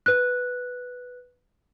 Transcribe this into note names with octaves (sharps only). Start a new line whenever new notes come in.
B4 F#6